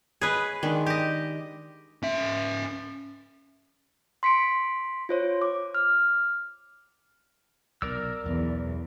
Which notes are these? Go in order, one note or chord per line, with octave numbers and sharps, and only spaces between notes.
G#4 B4 C#5 D#5 C#6
D#3 G#3 D4
G4 D#5
C#4 E5
C6 B6 C#7 D7
F4 C5 C#5
D6
F6
B1 C3 A#4 D5 E6
B1 E2